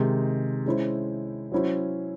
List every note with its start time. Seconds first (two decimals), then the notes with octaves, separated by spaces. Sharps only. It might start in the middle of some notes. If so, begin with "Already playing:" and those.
Already playing: C3 D#3 G#3 D#4
0.66 G#3 C#4 E4 C5
1.52 F#3 C#4 E4 C5